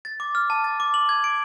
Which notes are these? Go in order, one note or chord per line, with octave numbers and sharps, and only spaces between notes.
A6
D6
F6
A5
A6
D6
F#7
G#6
D7